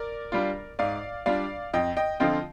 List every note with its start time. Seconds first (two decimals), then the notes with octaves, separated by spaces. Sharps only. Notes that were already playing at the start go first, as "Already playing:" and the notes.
Already playing: A#4 D5
0.32 G3 D4 F4
0.79 G#2 D5 F5
1.26 G3 D4 F4 D5 F5
1.73 F2 D#5 G5
1.97 D#5 G5
2.20 D3 F3 C4 F4 D#5 G5